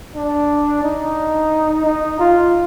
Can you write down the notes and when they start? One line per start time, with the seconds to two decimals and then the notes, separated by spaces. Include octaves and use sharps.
0.15 D4
0.83 D#4
1.85 D#4
2.20 F4